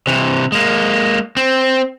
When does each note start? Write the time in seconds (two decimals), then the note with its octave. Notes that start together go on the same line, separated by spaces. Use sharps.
0.07 C3 E3
0.52 G#3 A#3
1.37 C4